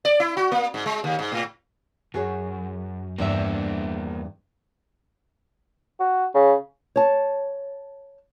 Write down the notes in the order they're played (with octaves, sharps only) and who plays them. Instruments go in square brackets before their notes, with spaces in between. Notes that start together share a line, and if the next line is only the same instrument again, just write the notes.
[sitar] D5
E4
F#4
A#3
G#2
G#3
D#2
G#2
A2
[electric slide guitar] F#2 [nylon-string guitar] F#4 G#4 C#5
[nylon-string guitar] E2 G2 E5 [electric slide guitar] A#3 D4
[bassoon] F#4
C#3
[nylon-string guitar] C#5 A5